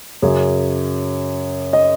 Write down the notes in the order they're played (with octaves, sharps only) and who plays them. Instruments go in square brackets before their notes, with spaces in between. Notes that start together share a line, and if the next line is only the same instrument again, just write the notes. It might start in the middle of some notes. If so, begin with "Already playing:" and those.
[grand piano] F#2 C#3 F#3 G#4
D#5